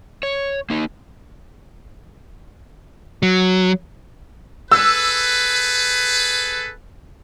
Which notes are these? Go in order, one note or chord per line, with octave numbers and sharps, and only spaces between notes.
C#5
A#3 D#4
F#3
G#4 A4 B4 E6